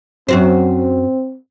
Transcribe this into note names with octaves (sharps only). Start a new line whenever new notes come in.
F#2 C4 F#4 C5